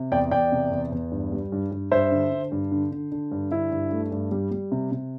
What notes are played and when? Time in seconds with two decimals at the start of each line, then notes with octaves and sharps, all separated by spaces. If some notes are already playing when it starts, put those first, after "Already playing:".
Already playing: C3
0.12 E2 D5 G5
0.31 E2 D5 G5
0.52 C3
0.71 E2
0.92 E2
1.12 G2
1.32 G3
1.52 G2
1.71 G2
1.91 G2 C5 E5
2.12 D3
2.32 D3
2.52 G2
2.71 D3
2.91 D3
3.12 D3
3.31 G2
3.51 D3 E4
3.72 G2
3.91 A3
4.11 G2
4.32 G3
4.51 G3
4.71 C3
4.92 C3